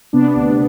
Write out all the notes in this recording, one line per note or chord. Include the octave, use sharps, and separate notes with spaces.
C3 B3 D4
D2